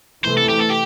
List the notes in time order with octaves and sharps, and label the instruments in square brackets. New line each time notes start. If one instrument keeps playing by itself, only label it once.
[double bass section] C3 E3 A3 [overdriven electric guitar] C5
[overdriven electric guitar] A4
G4
A4
G4